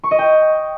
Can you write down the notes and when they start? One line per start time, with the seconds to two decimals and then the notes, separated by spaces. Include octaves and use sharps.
0.04 C#6
0.11 D#5
0.19 G5